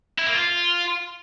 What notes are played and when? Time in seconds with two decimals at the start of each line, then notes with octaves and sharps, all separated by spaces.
0.19 E4
0.27 A#3
0.34 F4